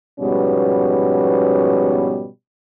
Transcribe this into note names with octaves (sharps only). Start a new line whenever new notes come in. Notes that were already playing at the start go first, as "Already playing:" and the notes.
G#2 B2 F3 G3 B3 C#4